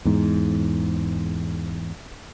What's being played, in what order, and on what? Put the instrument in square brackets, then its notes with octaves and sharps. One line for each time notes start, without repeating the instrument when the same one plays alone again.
[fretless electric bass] E2 G#2